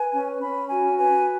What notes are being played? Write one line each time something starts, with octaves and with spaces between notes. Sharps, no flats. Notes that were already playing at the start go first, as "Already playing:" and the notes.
Already playing: B4 G#5
C#4
C#4 B5
F#4 G#5
B4 G#5